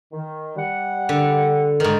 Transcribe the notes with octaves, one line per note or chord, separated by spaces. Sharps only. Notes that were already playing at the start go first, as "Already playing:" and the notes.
D#3
G3 F#5
D3
G#2 D#3